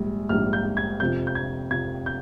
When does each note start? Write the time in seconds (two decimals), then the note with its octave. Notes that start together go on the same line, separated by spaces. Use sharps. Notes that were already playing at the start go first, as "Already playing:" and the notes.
Already playing: A#1 G#2 G3
0.29 A#1 G#2 G3 F6
0.53 G6
0.77 G#6
1.00 F2 C3 F3 G6
1.27 G6
1.35 G#6
1.71 F2 C3 F3 G#6
2.06 G6